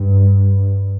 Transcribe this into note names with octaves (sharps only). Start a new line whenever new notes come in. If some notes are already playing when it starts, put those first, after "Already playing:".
Already playing: G2